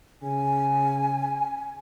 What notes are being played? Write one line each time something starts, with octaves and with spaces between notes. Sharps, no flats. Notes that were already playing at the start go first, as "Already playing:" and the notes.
C#3 G#5